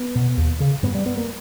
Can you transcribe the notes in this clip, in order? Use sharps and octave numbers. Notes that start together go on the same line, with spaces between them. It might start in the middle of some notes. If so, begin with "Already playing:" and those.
Already playing: B3
B2
D#2
C#3
G2 B3
G3
B3
A#3